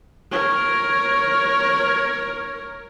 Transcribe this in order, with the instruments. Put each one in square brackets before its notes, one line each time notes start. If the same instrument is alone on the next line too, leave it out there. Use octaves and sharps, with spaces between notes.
[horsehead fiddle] A#4 C#5